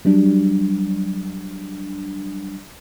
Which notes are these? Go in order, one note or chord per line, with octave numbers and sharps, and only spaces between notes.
F#3 G3 D4